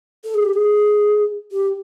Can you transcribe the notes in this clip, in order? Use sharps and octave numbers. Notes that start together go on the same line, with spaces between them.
A4
G#4
G4
G#4
G4